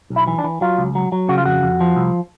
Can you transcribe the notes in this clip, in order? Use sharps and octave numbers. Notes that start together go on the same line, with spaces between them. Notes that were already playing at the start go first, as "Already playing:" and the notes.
B1
E4
E3
D4
E3
F#3 F4
C#2
F#3
F#3
C#3 F#4
F4
F2 F#4
F2
F3
C2